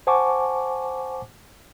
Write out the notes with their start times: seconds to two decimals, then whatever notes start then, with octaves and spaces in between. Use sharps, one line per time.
0.07 C5 F#5 G#5 A5 C#6 D6